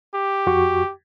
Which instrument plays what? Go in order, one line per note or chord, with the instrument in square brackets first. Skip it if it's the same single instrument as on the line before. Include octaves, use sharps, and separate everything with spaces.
[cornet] G4
[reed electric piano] F2 F#4 C#6